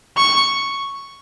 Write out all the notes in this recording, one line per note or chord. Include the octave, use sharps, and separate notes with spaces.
C#6